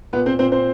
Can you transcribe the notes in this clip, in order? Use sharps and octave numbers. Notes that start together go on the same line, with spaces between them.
A#2 B3 B4
C4 C5
A#2 C4 C5
C4 C5